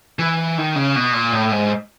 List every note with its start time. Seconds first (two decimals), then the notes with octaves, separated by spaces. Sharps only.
0.19 E3
0.58 D#3
0.76 C#3
0.96 B2
1.13 A#2
1.33 A2
1.52 G#2